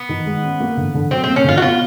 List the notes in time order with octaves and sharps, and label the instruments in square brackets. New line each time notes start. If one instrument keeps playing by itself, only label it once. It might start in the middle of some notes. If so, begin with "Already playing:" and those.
Already playing: [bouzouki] B3
[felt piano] D#3
G#3
C#4
A#3
D3
D3
[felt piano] F#3 [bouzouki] C4
[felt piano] A#3 [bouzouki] C4
[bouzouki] C#4
[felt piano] D3 [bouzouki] F4
[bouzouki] F#4
[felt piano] B3 [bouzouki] F4